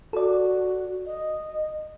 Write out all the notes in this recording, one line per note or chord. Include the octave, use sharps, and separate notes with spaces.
F#4 A4 D5
D#5